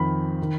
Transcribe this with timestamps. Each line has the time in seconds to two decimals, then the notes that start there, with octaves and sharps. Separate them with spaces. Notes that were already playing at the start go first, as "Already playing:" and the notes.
Already playing: F2 D#3 B5
0.42 D#3